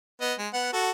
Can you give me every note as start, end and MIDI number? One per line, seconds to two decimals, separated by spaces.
0.21 0.34 59
0.21 0.34 75
0.39 0.48 56
0.53 0.73 59
0.53 0.73 78
0.73 0.91 66
0.73 0.91 69